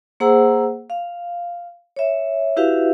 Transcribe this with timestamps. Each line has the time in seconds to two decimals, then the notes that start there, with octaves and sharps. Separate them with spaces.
0.20 A#3 G#4 C5 F#5 A#5 E6
0.90 F5
1.96 C#5 E5
2.57 E4 F#4 G4 B4 E5 F5